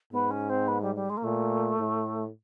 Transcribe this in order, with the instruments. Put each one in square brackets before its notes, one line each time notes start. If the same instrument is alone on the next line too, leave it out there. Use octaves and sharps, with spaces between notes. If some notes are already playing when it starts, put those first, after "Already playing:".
[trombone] G#2 [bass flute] B3
[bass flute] C#4
C4
B3
G3
G3
G#3
A#3
[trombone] A#2 [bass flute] A3
[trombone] A2